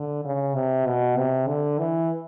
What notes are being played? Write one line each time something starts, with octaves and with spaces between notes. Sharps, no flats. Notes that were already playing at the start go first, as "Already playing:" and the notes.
Already playing: D3
C#3
C3
B2
C3
D3
E3